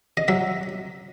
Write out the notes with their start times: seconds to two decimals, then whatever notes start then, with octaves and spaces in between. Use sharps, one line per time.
0.17 D#5
0.28 F#3 E5